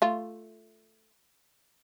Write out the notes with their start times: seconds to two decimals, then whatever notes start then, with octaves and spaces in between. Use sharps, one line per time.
0.02 A3 F4